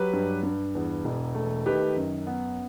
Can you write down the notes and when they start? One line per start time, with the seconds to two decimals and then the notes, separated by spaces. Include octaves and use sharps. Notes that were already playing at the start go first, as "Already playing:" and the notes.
Already playing: F#3 G4 B4
0.13 G2
0.43 G2
0.75 E2
1.05 E1
1.35 A3
1.66 D#3 G4 B4
1.96 F#2
2.27 B3